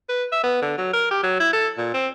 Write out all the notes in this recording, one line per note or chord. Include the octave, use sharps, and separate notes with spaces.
B4
E5
B3
D3
F#3
A#4
G4
F#3
E4
A4
A#2
C4